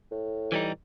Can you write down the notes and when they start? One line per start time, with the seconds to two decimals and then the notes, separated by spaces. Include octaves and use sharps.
0.12 A2
0.52 E3 G3 D#4